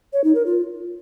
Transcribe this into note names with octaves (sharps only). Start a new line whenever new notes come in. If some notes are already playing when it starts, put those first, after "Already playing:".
C#5
D#4
A#4
F4